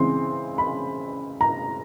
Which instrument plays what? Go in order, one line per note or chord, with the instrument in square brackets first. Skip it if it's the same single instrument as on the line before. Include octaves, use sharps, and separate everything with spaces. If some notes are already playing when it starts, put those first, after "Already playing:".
Already playing: [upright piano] C#3 E3 G#3 C4 C6
B5
A#5